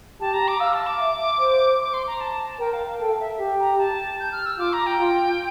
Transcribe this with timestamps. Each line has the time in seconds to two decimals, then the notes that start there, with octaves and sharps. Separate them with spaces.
0.20 G4 A5
0.34 A#5
0.48 D6
0.60 F5 E6
0.73 A5
0.87 D6
1.00 E5
1.40 C5
1.80 D6
1.93 C6
2.07 A#5
2.20 A5
2.50 A5
2.60 A#4 G5
2.73 F5
2.87 F5
3.00 A4 G5
3.13 F5
3.20 E5
3.40 G4
3.60 A#5
3.79 A5
4.20 G6
4.32 F6
4.46 E6
4.59 F4 D6
4.73 A#5
4.86 G5
4.99 F4